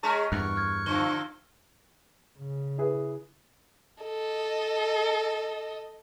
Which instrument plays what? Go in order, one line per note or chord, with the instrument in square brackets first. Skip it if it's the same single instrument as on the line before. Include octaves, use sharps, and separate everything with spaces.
[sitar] G#3 C#4 G#4 [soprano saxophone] A#5 [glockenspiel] C#6 F6
[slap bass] E2 G2 [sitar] A#4 [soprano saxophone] C#6 [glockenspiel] F#6
[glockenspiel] F6 G#6 A6
[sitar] D3 F3 C4 [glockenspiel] G7
[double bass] C#3
[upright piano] E4 G#4 B4
[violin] A4 D#5